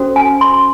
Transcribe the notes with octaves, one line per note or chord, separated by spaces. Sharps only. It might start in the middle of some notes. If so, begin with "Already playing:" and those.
Already playing: C#4 F#4 A4 C5
G#5
C6